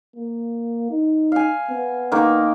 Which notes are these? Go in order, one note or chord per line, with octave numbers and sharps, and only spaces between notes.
A#3
D#4
F5 G#5
B3
D#3 A#3